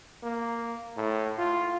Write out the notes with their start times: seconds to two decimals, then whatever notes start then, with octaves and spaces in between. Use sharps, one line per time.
0.23 A#3
0.97 A2
1.39 F4